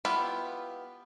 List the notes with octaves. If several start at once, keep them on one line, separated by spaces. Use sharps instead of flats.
B3 E4 F4 G4 B5